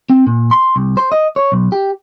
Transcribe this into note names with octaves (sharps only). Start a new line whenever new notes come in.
C4
A#2
C6
C2
C5
D#5
C#5
B1
G4